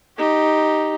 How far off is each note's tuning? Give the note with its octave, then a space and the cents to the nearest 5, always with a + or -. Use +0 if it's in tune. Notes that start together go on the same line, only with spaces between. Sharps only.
D#4 +0 G4 +0